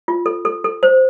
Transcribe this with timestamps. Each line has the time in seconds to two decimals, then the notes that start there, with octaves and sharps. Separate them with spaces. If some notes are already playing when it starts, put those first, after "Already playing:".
0.08 F4
0.26 A4
0.45 A4
0.64 A4
0.83 C5